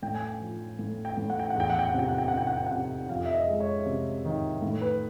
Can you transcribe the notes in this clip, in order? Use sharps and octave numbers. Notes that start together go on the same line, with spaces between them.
A2 G5
G#5
G5
F3
A2
G5
A2
F#5
G5
F#5
E2 G5
F#5
G5
F#5
C3
G5
F#5
G5
F#5
C3 G5
F#5
G5
C3 F#5
F2 F5
E5
D#5
G#3
C#5
C3
D#3
A2
B4